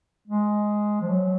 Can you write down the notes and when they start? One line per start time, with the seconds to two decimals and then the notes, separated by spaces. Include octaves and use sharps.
0.28 G#3
1.01 F3
1.09 F#3